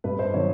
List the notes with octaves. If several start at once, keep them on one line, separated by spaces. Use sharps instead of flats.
G2 B4
C5
D#3 F#3 B3 C#5